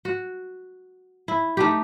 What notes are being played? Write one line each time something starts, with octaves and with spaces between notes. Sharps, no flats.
F#4
E4
A3 D#4 G4